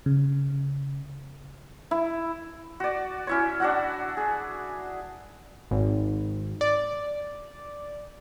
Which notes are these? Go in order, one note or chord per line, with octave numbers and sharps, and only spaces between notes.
C#3
E4
F#4 D5
C#4 E4 C#5
D4 F#4 F#5
G#4
G#1
D5